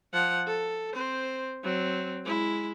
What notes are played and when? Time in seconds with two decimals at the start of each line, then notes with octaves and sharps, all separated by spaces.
0.13 F3 F#5
0.47 A4
0.93 C4 C5
1.64 F#3 C4
2.25 G#3 E4